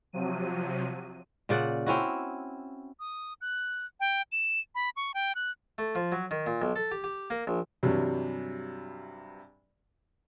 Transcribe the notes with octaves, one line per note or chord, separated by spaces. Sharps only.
C3 F3 F#3 D#7
A#2 C#3 D5 F#5
C4 C#4 E4 F#4
D#6
F#6
G5
E7
B5
C#6
G5
F#6
A3
F3
F#3
D#3
A#2
B1
A4
G4
G4
A#3
A#1
G2 C3 E3 F#3 G3